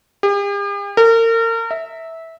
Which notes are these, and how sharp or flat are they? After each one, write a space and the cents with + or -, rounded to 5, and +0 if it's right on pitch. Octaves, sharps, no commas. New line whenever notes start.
G4 +45
A#4 -35
E5 -15